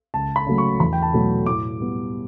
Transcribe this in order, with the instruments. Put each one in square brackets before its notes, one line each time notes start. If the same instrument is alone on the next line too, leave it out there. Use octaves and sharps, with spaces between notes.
[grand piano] C#2 A5
B5
C#3 F#3 A3
C#6
E2 B5
G5
A5
B2 F#3 A3
A2 D6
G3 B3